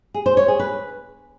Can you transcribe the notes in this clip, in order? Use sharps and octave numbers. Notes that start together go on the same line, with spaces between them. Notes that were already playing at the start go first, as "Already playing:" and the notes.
G#4
C5
C#5
G#4
B4